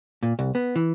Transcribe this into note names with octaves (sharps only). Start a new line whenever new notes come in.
A#2
C2
B3
E3